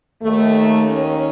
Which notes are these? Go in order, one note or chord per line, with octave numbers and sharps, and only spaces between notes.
D#2 D#3 A3
C#4